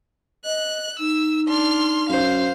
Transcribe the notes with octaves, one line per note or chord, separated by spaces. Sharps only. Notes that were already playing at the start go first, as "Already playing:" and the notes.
D#5 F#6
D#4 E6
D4 C6 F6
F#2 C5 F5